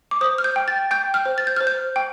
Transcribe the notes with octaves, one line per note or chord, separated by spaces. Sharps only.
D6
C5 D#6
F6
G6
G5
A6
G5 G6
F6
C5
A6
G6
C5 F6
G6
G5